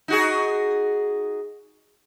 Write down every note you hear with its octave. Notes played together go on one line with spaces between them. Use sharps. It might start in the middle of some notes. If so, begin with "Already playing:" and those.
D#4 F#4 G#4